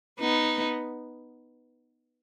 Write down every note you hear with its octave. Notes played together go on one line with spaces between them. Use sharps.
B3 D#4